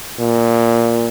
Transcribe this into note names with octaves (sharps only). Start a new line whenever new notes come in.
A#2